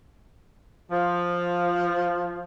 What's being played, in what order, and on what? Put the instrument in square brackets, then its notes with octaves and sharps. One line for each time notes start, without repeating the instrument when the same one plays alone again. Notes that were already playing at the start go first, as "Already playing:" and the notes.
[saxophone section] F3